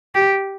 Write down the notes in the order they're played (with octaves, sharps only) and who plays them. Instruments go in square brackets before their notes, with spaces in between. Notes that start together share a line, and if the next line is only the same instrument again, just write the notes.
[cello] G4